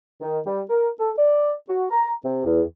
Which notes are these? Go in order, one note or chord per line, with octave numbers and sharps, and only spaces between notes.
D#3
G3
A#4
A4
D5
F#4
A#5
C3
E2